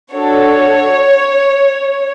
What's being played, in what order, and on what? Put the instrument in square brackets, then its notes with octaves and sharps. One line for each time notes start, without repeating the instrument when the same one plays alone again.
[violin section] D4 F#4 A4 C#5